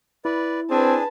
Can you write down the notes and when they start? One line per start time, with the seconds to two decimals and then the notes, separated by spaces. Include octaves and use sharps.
0.25 E4 B4 D5
0.70 C4 D4 G#4 B4 G#5 A5